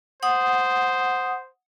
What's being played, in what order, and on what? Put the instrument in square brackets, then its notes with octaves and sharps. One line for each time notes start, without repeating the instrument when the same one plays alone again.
[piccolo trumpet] C5 [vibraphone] F#5 D#6